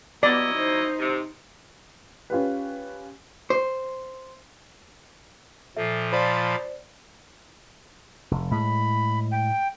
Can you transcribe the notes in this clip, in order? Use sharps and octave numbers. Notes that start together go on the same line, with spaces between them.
F#3 B3 E4 D5 D#5
D#4 C5
C3
C#4 F4 G4 B4
C5
A#2 F3 A4 E5
F4 C5 D5 A5 B5
F1
A2 G#3 B5
G5